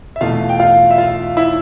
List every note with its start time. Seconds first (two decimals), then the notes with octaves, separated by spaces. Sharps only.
0.16 E5
0.21 E2 B2 A3 F4 F5
0.49 G5
0.60 F4 F5
0.91 E5
0.98 F4 F5
1.37 E4 E5